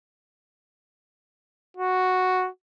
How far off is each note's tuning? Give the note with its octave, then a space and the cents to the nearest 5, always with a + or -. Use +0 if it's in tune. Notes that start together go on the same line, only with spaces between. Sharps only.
F#4 +0